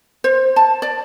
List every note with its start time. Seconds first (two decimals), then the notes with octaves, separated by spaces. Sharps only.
0.24 C5
0.56 A5
0.82 D5